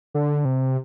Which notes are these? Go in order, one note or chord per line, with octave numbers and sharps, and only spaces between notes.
D3
C3